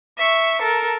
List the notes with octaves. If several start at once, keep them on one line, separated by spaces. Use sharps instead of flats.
E5 C#6
A4 A#4